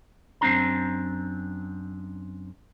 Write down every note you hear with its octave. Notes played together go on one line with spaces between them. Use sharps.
F#2 C4 D4 A#5